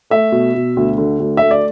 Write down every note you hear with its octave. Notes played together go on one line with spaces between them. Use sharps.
A3 E5
B2
B2
D2
D3
D2
A3 E5
D5